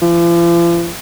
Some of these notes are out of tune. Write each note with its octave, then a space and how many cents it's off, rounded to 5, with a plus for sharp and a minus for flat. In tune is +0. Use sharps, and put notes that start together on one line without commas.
F3 -45